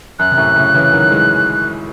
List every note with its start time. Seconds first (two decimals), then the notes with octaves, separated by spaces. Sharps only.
0.19 F#2 F#6
0.31 C3
0.37 F#2 A2
0.56 A2 C#3
0.74 C#3 E3
0.93 D#3 F#3
1.11 E3 G#3